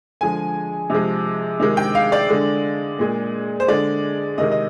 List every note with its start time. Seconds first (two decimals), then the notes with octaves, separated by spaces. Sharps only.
0.21 D3 F3 G#3 G#5
0.90 C3 F3 G#3
1.60 C3 D#3 G#3
1.77 G5
1.95 F5
2.12 D5
2.30 D3 G#3
2.99 A#2 G#3
3.60 C5
3.68 D3 G#3 D5
4.38 C3 D#3 G#3 D#5
4.52 D#5